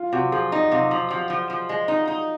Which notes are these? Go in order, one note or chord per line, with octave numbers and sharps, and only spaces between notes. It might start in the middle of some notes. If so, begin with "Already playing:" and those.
Already playing: F4
C3 F#4
F3 G#4
D#4
D#5
C3 F5
F3
F3
F3
F3
G#3
D#4
D#4